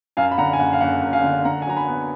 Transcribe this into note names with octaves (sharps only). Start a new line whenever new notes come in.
F#2 F5 G#5
B5
D3 F#5 A#5
G#5
F#1 F#5
F5
F#1 F#5
F#2
F5 G#5
D3
D3 F#5 A#5
G#5
F#3 A#5
G#5 B5
B3